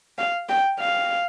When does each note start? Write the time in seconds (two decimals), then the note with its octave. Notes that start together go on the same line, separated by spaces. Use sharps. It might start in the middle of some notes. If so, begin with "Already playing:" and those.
0.18 F5
0.49 G5
0.80 F5